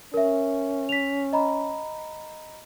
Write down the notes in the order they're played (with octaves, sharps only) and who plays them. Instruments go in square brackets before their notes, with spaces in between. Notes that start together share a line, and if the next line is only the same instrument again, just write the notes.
[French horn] C#4 [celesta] A#4 E5
[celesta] B6 F7
D#5 A#5 B5